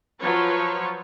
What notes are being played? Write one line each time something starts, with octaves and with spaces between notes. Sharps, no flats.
F3 F#3 B4 C#5